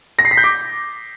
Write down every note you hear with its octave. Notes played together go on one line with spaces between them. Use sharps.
A#6
C7
B6
G6
D6